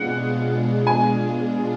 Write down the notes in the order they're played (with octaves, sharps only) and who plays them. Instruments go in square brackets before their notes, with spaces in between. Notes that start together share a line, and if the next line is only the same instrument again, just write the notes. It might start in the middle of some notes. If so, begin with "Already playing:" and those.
Already playing: [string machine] B2 G#3 D4 F4 G#4 [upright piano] F#5
[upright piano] G#5